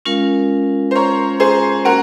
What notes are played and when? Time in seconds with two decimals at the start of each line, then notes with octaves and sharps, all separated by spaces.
0.05 G#3 C#4 F4 A#4 F5
0.91 C5
0.95 A#4 C#5
1.40 G#4 C5
1.85 A#3 C#4 F#4 A#4